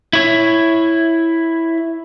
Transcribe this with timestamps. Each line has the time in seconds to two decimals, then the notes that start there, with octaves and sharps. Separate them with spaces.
0.13 E4 C#5